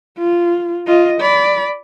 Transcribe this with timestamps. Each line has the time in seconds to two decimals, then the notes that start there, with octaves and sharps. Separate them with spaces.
0.18 F4
0.87 F4 D#5
1.21 D5 B5